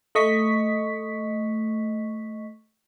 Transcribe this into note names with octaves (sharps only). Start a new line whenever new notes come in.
A3 D#5 C#6 B6